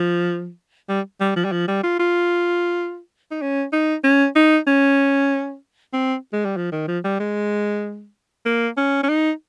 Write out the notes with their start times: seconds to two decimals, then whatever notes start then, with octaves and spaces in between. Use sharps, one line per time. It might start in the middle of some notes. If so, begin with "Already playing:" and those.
Already playing: F3
0.89 G3
1.20 G3
1.36 F3
1.45 G3
1.52 F3
1.68 G3
1.84 F4
1.99 F4
3.31 D#4
3.41 C#4
3.73 D#4
4.04 C#4
4.36 D#4
4.67 C#4
5.93 C4
6.33 G#3
6.45 G3
6.57 F3
6.72 D#3
6.88 F3
7.04 G3
7.20 G#3
8.46 A#3
8.77 C#4
9.03 C#4
9.09 D#4